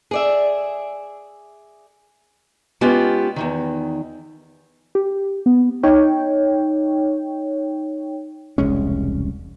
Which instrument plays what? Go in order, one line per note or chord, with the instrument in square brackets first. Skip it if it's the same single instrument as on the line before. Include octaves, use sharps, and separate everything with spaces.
[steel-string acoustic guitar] G#4 D5 E5
G#3 B3 C#4 F4 G4
E2 G#2 D#3
[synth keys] G4
B3
[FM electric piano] D#4 C#5 G5
[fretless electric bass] E1 C2 G#3 C#4